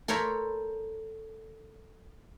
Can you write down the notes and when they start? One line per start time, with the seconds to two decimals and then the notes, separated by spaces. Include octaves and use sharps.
0.08 A4 A#4 C5 C#5 A#5 B5